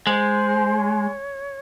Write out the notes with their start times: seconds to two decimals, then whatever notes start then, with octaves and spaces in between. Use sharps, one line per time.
0.07 G#3 C5
0.78 C#5